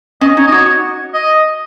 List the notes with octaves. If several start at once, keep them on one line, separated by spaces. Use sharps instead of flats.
C#4 D#5
D#4 C#5
D#5
F#4 C#5
D#5